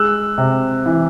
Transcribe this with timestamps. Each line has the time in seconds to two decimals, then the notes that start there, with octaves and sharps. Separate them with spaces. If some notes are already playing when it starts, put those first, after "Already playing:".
Already playing: G#3 E6 F#6
0.38 C3
0.86 E3